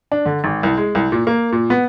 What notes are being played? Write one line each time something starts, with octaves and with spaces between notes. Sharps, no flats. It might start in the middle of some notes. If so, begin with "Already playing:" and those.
D4
D3
G#1
C2
G#3
C2
A#2
A#3
A#2
B3